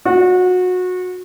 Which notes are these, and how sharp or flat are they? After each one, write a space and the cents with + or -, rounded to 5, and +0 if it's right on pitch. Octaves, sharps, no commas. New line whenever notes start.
F#4 -25